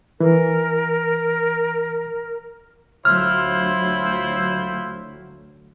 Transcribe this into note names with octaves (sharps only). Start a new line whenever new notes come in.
E3 A#4
D2 F#3 E4 F4 C5 F6